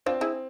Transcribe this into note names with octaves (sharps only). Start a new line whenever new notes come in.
C4 D4 F4
E4 G#4